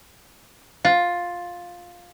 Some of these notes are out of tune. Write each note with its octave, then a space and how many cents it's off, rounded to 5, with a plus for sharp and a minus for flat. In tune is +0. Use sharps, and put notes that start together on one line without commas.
F4 +10